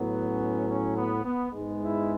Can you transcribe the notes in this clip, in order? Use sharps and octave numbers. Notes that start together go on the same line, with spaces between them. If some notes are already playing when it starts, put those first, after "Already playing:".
Already playing: A2 F#3 B3
C#4
C#4
B3
B3
G#2 G#3 B3
E4